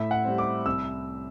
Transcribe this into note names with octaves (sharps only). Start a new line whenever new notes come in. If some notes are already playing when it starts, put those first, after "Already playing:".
Already playing: A2 E5
F#5
G3 C4
D6
C2 E6